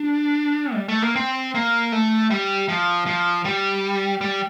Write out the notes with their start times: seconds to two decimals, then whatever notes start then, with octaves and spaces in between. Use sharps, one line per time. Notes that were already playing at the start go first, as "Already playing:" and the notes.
Already playing: D4
0.74 G3
0.89 A3
1.02 A#3
1.16 C4
1.55 A#3
1.92 A3
2.30 G3
2.69 F3
3.06 F3
3.45 G3
4.21 G3